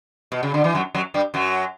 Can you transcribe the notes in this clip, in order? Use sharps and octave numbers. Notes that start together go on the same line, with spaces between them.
B2
C#3
D3
E3
F#2 F#3
F#2 F#3
G2 G3
F#2 F#3